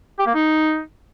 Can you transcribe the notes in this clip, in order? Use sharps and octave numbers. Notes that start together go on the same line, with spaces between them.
G4
A#3
D#4